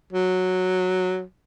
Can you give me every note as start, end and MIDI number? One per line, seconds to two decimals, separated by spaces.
0.12 1.22 54